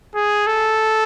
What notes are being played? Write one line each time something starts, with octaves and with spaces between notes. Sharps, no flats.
G#4
A4